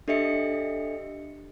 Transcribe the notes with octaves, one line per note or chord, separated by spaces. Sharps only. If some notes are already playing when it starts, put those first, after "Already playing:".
D4 G4 A4 D#5 E5 C#7